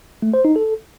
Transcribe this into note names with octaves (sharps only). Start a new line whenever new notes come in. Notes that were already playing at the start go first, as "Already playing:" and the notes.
A3
C5
D#4
A4